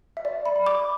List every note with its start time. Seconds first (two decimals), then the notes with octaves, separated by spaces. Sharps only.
0.17 E5
0.25 D5
0.46 B5
0.56 B5
0.66 D6